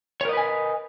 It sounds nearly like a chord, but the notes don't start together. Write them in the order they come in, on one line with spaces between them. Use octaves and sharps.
C#5 A#4 D#5 B4 G#5